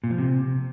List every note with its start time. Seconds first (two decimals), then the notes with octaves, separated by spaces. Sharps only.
0.04 A#2
0.11 F3
0.18 C3